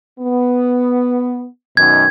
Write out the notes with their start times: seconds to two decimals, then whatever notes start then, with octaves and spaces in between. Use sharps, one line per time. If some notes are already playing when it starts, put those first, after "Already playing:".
0.19 B3
1.77 F#2 B2 D#3 G#6